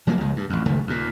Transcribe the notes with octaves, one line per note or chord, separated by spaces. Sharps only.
F1 F3 F#3 A#3
C#2 G#3
G2
A1 F2
F#1 C#2 D#3 A3
D#2 A#2